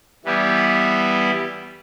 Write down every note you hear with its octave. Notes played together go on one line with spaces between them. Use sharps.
E3 G3 B3 E4 G4